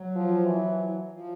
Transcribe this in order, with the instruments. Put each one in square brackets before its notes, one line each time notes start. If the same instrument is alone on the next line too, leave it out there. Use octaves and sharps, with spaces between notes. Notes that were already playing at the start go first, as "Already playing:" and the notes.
Already playing: [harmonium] F#3
[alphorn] F3
E3
[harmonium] F3